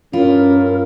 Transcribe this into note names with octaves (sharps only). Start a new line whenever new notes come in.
G2 C#4 E4 F4 A#4